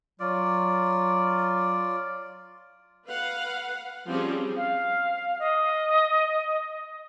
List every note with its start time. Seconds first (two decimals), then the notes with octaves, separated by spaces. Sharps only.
0.20 F#3 F4 D5
3.06 B4 F5 F#5
4.07 F3 G3 C4 C#4 G#4
4.57 F5
5.39 D#5